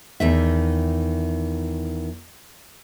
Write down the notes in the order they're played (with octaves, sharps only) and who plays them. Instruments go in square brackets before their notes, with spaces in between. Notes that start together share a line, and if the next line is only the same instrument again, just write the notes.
[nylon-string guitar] E2 D#3 E5